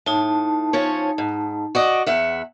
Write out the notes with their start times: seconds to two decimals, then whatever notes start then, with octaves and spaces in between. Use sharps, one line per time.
0.06 A2 D#4 A5
0.73 F3 C#4 C#5
1.18 G#2
1.75 F#4 D5 D#5
2.06 E2 E5 F#5